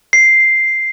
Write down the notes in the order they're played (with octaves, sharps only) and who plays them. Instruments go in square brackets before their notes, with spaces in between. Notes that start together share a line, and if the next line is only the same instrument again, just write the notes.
[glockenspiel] C7